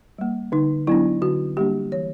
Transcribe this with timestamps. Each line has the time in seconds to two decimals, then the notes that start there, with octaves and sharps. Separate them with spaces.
0.18 G3 A#3
0.52 D3 D#4
0.87 F#3 B3 D4 E4
1.22 D3 F#4
1.57 G3 A#3 D4 G4
1.92 E3 C#5